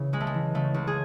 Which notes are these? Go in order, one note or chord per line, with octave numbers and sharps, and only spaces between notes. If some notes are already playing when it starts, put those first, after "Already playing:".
Already playing: C#3 E3
C#2 G#3
A3
G#3
E3
C#3 A3
C#2
G#4